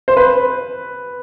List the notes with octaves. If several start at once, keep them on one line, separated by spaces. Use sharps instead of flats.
C5
B4